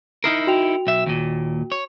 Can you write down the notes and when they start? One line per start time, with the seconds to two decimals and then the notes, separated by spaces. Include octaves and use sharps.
0.24 D#4 E4 A#4 D#6 F6 C7
0.47 F#4 G5 F7
0.87 B1 E5
1.06 D#2 A#2
1.72 C#5